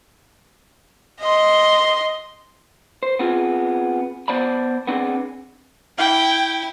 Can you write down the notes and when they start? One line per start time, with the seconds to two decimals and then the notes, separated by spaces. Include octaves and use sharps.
1.21 D#5 C6
3.03 C5
3.19 B3 C4 F4 G4 G#4
4.28 B3 C5 D5 A5 B5
4.87 B3 C4 D4 G#4
5.98 E4 G5